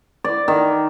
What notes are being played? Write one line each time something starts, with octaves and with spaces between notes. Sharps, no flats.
D5
D#3